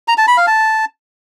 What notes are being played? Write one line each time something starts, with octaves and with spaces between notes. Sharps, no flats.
A#5
A5
B5
F5
A5